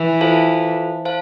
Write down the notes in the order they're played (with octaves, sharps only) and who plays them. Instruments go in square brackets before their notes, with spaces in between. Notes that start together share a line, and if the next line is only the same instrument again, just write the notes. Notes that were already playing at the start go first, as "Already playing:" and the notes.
Already playing: [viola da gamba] E3
[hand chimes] F4 A4 C5 F5 A5
C5 F5 A5